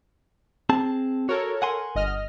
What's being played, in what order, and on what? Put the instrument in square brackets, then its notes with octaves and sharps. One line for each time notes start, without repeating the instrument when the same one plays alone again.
[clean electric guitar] C4 G#4 A5
[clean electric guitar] F#4 [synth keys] A4 A#4 C#5
[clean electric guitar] F#5 G#5 C6
[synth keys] G1 D#5 F6